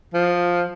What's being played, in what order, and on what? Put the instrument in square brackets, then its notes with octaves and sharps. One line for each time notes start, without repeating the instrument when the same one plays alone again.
[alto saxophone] F3